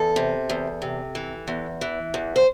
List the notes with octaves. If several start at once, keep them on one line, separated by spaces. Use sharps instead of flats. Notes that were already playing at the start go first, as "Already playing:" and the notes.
Already playing: E2 A4
C3
E2
C3
E3
E2
E3
E2
C5